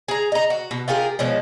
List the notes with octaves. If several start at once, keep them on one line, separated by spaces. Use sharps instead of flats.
G#4 A#5
D#5 A#5
F#4
B2
F4 G4 G#4 A#4
B2 F3 G#3 C#4